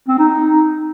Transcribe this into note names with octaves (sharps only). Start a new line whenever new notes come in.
C4
D#4